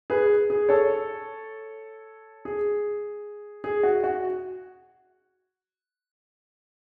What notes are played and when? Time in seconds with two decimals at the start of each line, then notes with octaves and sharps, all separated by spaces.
0.10 G#4 B4
0.50 G#4
0.69 A4 C#5
2.45 G#4
3.64 G#4
3.83 F#4
4.04 F#4